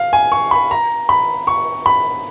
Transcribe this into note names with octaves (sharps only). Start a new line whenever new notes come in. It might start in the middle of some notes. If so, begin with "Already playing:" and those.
Already playing: F5
G#5
C#6
B5
A#5
B5
C#6
B5